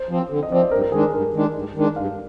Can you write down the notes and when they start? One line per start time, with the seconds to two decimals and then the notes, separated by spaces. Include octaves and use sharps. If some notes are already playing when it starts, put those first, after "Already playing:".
Already playing: C5
0.09 F3 C4
0.30 D3
0.43 D#5
0.51 F3 C4 D5
0.62 C5
0.71 G2 A#4
0.82 A#4
0.92 D#3 G#3 D4 G#4
1.03 A#4
1.13 G2 A#4
1.34 D#3 G#3 D4
1.54 G2
1.75 D#3 G#3 D4
1.96 G2 F5